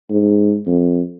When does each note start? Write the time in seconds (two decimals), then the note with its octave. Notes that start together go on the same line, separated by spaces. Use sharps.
0.10 G#2
0.66 F2